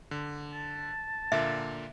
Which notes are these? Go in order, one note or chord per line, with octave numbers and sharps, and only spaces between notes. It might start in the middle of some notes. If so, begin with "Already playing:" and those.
D3
A5
A#2 D3 A#3 E5